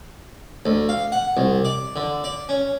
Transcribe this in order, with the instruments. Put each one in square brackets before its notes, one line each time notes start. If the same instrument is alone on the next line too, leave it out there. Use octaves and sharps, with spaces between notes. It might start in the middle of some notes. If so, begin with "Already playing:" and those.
[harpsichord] D2
F5
F#5
C2
D5
D3
D5
C#4